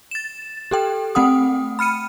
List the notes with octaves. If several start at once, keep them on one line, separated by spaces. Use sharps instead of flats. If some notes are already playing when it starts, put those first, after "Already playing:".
A6 E7
G4 A4 G5
A3 C4 F#5 G5 D#6
B5 F6 C#7 D#7